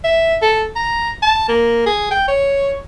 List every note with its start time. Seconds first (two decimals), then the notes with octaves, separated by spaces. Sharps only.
0.04 E5
0.42 A4
0.75 A#5
1.23 A5
1.48 A#3
1.86 G#4
2.11 G5
2.28 C#5